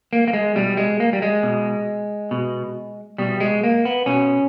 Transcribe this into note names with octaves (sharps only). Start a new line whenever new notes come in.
A#3
A#3
G#3
B2 G3
G#3
A#3
G3
G#3
B2
B2
B2 G3
G#3
A#3
B3
B2 C#4